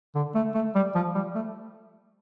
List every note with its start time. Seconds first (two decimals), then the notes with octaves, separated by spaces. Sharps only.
0.15 D3
0.35 A3
0.55 A3
0.75 G3
0.95 F3
1.15 G3
1.35 A3